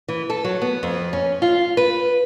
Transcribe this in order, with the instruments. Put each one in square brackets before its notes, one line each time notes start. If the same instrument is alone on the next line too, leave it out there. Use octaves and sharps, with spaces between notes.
[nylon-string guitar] E3
A4
F#3
B3
F2
C#4
F4
B4